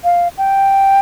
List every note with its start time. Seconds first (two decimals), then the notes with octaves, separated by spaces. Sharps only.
0.04 F5
0.38 G5